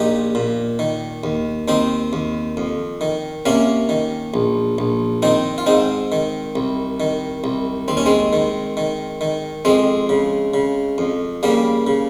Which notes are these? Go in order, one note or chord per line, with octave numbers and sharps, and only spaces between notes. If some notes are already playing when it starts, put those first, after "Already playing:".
Already playing: A#1 A#2 D#4 G4
A#2
D#3
D#2
D#2 C4 D#4
D#2
F2
D#3
C3 A#3 C#4
D#3
A#1
A#1
D#3 C4 D#4
F4
G#2 C4 D#4
D#3
C2
D#3
C2
D#2 C4
C#4
G#3 C4
D#3
D#3
D#3
F2 G#3 C4
C#3
C#3
F2
C#3 G3 A#3
C#3